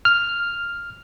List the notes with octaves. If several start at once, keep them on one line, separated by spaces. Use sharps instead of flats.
F6